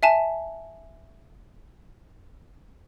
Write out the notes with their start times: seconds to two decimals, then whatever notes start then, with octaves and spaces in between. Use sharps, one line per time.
0.03 E5 G#5 A5